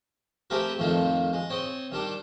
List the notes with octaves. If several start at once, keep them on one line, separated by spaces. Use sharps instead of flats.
A3 C4 G4 G#4 A#4 B4
F2 A2 D#3 F3 C4
G#3
C4 C#5 D#5 C6
D#3 G3 D4